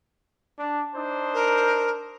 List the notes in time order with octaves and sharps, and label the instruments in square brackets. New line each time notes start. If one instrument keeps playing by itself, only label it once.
[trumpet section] D4
D4 D#4 C5
[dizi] A#4